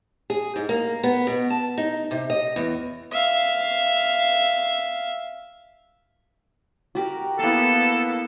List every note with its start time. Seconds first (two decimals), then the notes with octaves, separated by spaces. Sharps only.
0.30 G#4
0.56 G#2
0.69 A#3
1.03 B3
1.27 B2
1.50 A5
1.78 D#4
2.11 C3
2.30 D#5
2.56 E2
3.12 E5 F5
6.95 F#4 G4 A#4
7.39 A#3 B3 E4 A4 F5